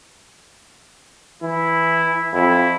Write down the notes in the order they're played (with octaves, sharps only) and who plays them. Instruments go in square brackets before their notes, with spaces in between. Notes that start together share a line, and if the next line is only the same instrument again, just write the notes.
[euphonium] E3 [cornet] E4
[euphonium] F2 [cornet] E4